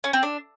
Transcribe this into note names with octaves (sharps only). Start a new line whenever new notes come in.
C#4
C4
D4